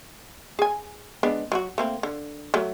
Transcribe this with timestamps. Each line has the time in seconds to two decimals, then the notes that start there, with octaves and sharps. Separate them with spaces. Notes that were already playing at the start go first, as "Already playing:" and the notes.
0.59 G#4 G#5
1.23 G#3 B3 D4
1.52 F#3 F4 F#4
1.78 A3 A#3 C4
2.03 D3
2.54 F#3 A3